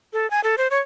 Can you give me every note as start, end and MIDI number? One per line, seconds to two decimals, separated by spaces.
0.13 0.29 69
0.31 0.40 80
0.44 0.55 69
0.58 0.68 72
0.71 0.79 73